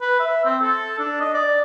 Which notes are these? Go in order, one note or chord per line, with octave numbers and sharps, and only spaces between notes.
B4
E5
C4
A4
D4
D#5
D5